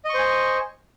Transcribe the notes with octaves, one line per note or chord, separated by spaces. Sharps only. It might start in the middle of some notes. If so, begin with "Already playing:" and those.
C5 D#5 G#5 C#6